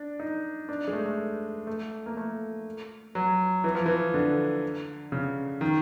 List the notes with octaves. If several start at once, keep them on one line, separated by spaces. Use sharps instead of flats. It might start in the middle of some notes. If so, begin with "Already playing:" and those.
Already playing: D4
D#4
D4
G#3
A3
A3
A3
A#3
A3
F#3
E3
F3
E3
D3
C#3
D#3